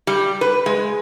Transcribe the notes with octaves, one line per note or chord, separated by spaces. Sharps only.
G3
B4
G#3